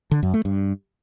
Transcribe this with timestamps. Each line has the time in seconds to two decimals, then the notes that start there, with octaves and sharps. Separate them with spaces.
0.11 D3
0.23 F#2
0.34 A3
0.45 G2